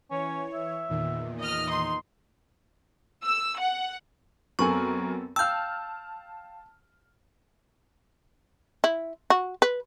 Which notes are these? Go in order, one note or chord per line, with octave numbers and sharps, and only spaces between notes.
E3 C#4 C#5
E5
E2 A#2 D#3
D#5 F6
D#4 C6
E6
F#5
F#2 B3 C4 A4 A#4 G#5 C#6
F5 G5 A5 E6 F6 G6
E4
F#4
B4